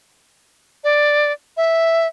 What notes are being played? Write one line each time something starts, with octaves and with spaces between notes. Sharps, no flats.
D5
E5